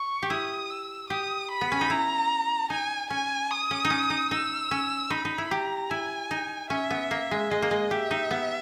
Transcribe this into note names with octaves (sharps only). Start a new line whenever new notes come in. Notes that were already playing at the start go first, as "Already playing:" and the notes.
Already playing: C#6
G4
E4 D#6
E6
G4 D#6
B5
B3
C#4
D#4
E4 A#5
D#4 G#5
C#4 G#5
D#6
C#4
D#4
C#4
D#4
D#4 E6
C#4
D#4 B5
D#4
E4
G4 A#5
E4 G#5
D#4
C#4 E5
B3
A#3
G#3
G#3 D#5
A#3
G#3
G4 E5
D#4
B3